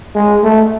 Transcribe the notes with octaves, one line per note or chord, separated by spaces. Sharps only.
G#3
A3